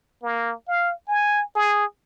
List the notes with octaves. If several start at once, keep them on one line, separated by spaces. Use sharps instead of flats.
A#3
F5
G#5
G#4